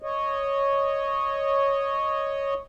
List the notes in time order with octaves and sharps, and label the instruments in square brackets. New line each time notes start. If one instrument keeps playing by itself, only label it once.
[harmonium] C#5 D#5